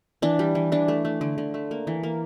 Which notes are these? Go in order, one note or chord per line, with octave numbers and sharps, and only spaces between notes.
E3 D4
G3
E3
E3 D4
A3
A3
D3
D3
A3
A#3
E3
A#3